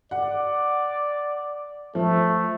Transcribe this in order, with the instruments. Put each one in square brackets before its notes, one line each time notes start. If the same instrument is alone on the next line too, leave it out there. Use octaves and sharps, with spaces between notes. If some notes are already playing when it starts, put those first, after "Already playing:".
[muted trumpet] D5 [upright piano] F#5
[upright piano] F3 [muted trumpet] A3